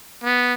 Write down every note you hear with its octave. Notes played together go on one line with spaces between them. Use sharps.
B3